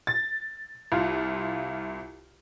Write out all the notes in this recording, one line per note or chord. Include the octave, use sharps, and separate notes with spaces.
A6
C2 F4